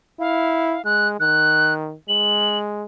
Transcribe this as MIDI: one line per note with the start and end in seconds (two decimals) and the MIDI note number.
0.20 0.77 64
0.20 0.82 77
0.85 1.20 56
0.85 1.08 90
1.20 1.94 51
1.20 1.73 90
2.09 2.86 56
2.09 2.58 102